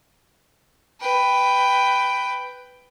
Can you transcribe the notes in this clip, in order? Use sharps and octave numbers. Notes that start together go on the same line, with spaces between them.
B4 G5